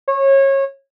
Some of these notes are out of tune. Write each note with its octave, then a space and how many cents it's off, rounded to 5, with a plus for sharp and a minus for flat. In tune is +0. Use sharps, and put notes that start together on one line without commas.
C#5 -25